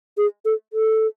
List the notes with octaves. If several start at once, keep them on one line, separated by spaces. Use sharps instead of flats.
G#4
A4
A4